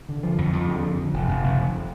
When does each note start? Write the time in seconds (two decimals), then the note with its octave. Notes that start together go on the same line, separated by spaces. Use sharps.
0.09 D3
0.23 F3
0.38 F2
0.53 F2
0.68 D3
0.83 F2
0.98 F2
1.13 F1
1.28 F1
1.43 F1
1.58 F2